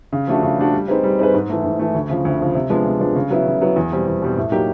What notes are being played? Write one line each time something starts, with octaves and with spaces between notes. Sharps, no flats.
C#3
F3 A3 D4 F#4
C#3
F3 A3 D4 F#4
G3
C4 D#4 G#4 B4
G3
C4 D#4 G#4 B4
G#2
E3 A3
G#2
E3 A3
D2
C#3 F3
D2
C#3 F3
C3
F3 G#3 B3 D4
C3
F3 G#3 B3 D4
C#3
F#3 B3 E4
C#3
F#3 B3 E4
E2
B2 G3 C4
E2
B2 G3 C4
A2
F#3 A#3 D#4 G4